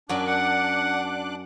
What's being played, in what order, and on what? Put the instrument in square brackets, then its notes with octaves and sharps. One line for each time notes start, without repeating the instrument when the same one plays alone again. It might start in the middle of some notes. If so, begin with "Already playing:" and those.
[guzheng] F#2 F#4 [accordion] D4 D6 F#6
[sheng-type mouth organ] F#5